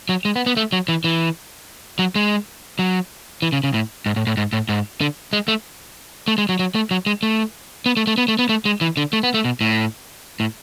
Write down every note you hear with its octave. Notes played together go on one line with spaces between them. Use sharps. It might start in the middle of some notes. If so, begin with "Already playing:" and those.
F#3
G#3
B3
B3
A3
F#3
E3
E3
F#3
G#3
F#3
E3
C#3
C#3
A2
G#2
A2
A2
G#2
A2
G#2
D3
G#3
A3
A3
G#3
F#3
F#3
A3
F#3
G#3
A3
B3
A3
A3
B3
A3
B3
A3
G#3
E3
D3
A3
B3
A3
B2
A2
A2